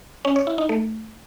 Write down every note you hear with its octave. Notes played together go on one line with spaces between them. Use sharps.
C#4
C#5
E4
D#4
A3